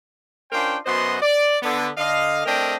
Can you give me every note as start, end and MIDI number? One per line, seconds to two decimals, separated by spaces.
0.52 0.77 61
0.52 0.77 62
0.52 0.77 65
0.52 0.77 70
0.52 0.77 72
0.52 0.77 79
0.86 1.17 42
0.86 1.17 59
0.86 1.17 66
0.86 1.17 72
0.86 1.17 75
0.86 1.17 84
1.22 1.57 74
1.63 1.89 50
1.63 1.89 59
1.98 2.45 50
1.98 2.45 75
1.98 2.45 77
2.46 2.76 57
2.46 2.76 60
2.46 2.76 62
2.46 2.76 70
2.46 2.76 75
2.46 2.76 79